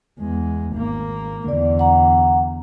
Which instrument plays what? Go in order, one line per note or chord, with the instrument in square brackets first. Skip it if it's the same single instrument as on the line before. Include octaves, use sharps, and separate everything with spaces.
[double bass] E2 G#3
G#1 A#3
[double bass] E2 D3 [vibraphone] D5
[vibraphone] F#5 A#5